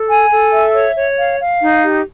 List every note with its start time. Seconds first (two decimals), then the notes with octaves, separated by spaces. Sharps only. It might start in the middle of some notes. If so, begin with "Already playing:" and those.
Already playing: A4
0.09 G#5
0.31 A4
0.53 E5
0.74 C#5
0.96 C#5
1.18 F5
1.40 F5
1.61 D#4
1.83 G4